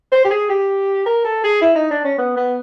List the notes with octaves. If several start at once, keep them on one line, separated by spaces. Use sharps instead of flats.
C5
G4
G#4
G4
A#4
A4
G#4
E4
D#4
D4
C#4
B3
B3